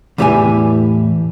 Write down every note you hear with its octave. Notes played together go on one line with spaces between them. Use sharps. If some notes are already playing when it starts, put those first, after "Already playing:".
E2 A2 E3 G4 E5 G#5